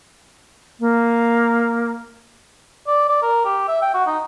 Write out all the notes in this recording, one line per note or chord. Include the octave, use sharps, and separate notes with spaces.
A#3
D5
D5
A#4
G4
E5
G5
F#4
D#4